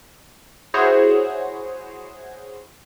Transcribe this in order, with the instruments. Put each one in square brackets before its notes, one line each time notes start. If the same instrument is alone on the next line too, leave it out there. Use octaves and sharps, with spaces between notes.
[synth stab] E4 F#4 G#4 C5 C#5